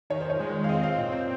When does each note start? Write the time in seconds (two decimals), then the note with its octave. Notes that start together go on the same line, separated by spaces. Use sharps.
0.10 D#3 C#5
0.21 C5
0.30 C#5
0.40 G#3
0.64 F5
0.69 C4 D#5
0.83 F5
0.98 A#2 D#5
1.13 C5